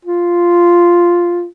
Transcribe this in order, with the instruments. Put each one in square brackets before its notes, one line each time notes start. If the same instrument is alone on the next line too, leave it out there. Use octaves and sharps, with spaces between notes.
[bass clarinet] F4